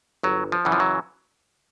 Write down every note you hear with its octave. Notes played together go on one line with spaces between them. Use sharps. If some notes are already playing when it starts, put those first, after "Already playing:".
G1 F#3
F3
F#2 C#3 E3
F3
F#3